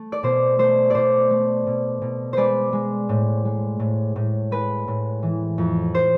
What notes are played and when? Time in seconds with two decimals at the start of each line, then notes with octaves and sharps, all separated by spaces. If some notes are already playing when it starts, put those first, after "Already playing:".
Already playing: A3
0.12 D5
0.23 B2 C5
0.59 A3 C5
0.90 B2 C5 D5
1.30 A3
1.67 B2
2.02 B2
2.33 G#3 B4 C5 D5
2.73 G#3
3.09 A2
3.45 G#3
3.80 A2
4.16 A2
4.51 G#3 B4
4.88 A2
5.22 E3
5.58 F2
5.95 C5